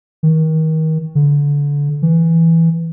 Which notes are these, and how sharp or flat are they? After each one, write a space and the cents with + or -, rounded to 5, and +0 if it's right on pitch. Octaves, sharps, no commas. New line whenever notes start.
D#3 +30
D3 -25
E3 +0